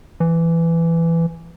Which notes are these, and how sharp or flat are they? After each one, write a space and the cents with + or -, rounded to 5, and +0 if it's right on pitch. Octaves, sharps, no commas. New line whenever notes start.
E3 +15